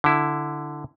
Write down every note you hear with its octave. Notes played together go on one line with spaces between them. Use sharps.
D3 E4